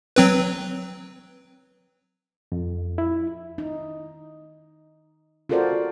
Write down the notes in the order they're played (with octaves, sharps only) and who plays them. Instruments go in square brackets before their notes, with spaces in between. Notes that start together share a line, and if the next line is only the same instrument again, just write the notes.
[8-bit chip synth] F#3 C4 B4
[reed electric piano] F2
E4
[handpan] D#4
F4 F#4 A4 A#4 C5 D5